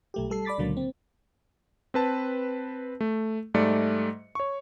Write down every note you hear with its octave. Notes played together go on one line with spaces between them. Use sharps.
B1 A3 G4
G3 A4 C7
D5 B5 D6 A6 B6
C#2 A#2 D3 F#3 A#3
C4
C4 B4 A5
A3
G#2 G3 A3 D5 E5 C#7
C#5 C#6